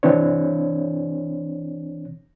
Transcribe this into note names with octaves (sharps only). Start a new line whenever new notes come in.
E3 C4 D4 C#5